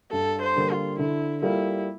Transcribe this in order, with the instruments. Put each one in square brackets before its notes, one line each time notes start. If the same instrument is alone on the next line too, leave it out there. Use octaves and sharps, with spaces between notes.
[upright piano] G2 [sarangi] A4
[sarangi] C5
[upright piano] D3 G3 A#3
[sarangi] F4
[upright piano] D3 [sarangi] E4
[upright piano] G3 A#3 F4 A4 [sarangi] E4